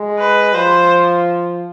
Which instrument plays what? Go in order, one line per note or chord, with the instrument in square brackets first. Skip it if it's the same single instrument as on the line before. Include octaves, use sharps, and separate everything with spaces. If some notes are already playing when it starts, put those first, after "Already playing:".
Already playing: [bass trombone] G#3
[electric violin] B4
[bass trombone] F3 [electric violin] C5